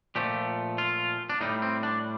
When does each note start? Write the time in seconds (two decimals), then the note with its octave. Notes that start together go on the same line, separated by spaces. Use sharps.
0.16 A#2 F3 A3 G4
0.78 F4
1.30 D4
1.41 A2 G3 D#4
1.62 C4
1.83 D4